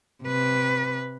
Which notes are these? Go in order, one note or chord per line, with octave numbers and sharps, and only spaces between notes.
C3 B4